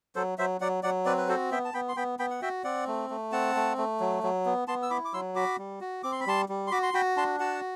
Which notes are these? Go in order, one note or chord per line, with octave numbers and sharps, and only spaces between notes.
F#3 A4 C5
F#3 C5 E5
F#3 D5 F#5
F#3 D5 F#5
C4 B4 D5
B4
F#4 A4 C5
B3 E5 G5
A5
B3 G5 B5
C6
B3 G5 B5
B3 G5 B5
F#5
F#4 E5 G5
C4 D5 F#5
A3
A3
C4 F#5 A5
A3
A3
F#3
F#3
B3
B3 A5 C6
E6
E4 B5 D6
D6
F#3 C6 E6
F#4 B5 D6
G3
F#4
C4 D6
C6
B5
G3 A5 C6
G3
C6
F#4 B5 D6
C6
F#4 G5 B5
D4 A5 C6
F#4 F#5 A5